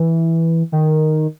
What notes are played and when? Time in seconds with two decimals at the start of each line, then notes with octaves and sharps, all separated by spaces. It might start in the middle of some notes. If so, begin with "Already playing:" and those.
Already playing: E3
0.72 D#3